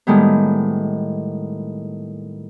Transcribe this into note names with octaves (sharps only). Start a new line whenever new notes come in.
A2 D#3 G3 G#3 B3